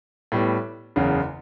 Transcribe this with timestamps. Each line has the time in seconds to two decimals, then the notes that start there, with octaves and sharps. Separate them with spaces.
0.32 A2 G3 B3
0.96 F#1 E2 C#3